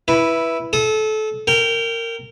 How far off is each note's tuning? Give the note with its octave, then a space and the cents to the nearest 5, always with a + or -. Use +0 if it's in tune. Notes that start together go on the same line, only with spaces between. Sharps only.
E4 +0 B4 -10
A4 -25 D#6 +5
A#4 -20 G5 +0